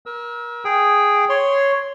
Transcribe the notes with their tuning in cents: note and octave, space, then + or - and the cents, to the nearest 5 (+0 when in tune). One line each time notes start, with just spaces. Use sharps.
A#4 +30 E6 -20
G#4 -5 G5 +0
C#5 +0 C6 +0